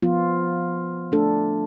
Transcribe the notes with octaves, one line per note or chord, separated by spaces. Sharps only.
F3 B3 F4
A3 D4 A4